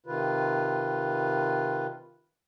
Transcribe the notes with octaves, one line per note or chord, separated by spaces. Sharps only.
C3 D#3 F4 B4